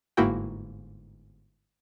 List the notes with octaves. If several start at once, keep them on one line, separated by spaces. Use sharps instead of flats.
G1 G#2 A#3 E4 F#4 G5